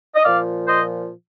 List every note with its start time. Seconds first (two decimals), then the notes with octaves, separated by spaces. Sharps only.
0.16 D#5
0.24 A#2 F3 D5 F5
0.67 C5 D#5